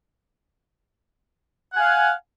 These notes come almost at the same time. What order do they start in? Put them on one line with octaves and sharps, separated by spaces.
F#5 G#5 F5